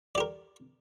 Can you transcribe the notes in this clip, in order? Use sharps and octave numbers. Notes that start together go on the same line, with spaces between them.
G4 A#4 D5